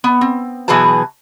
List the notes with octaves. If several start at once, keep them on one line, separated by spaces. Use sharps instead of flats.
B3
C4
B2 E3 F#3 G#4 B4 A5